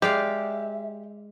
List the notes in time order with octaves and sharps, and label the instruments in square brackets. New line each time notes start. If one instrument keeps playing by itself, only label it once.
[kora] G#3 D5 F5 [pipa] G4 [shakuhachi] E5